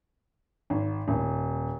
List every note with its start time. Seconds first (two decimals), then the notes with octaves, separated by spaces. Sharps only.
0.70 G#1
1.08 D#1